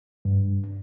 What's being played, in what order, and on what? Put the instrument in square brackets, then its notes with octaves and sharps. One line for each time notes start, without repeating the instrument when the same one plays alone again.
[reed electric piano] G2